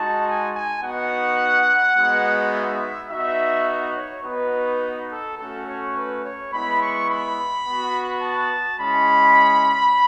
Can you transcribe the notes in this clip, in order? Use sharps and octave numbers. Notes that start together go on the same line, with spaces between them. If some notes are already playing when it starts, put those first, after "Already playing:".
Already playing: G#3 D#4 F#4 A5
G#5
G#5
B3 D#4 F#4 F#5
G#3 B3 D#4 F#4
E5
B3 D#4 F#4 E5
C#5
B3 D#4 F#4 B4
A4
A3 C#4 F#4 A4
C#5
B4
C#5
G#3 B3 E4 B5
C#6
B5
B3 F#4
A5
G#3 C#4 E4 B5